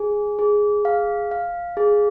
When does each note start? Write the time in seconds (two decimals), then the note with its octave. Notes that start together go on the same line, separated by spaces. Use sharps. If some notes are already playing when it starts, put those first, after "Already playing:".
Already playing: G#4 G#5
0.39 G#4
0.85 F5
1.31 F5
1.77 G#4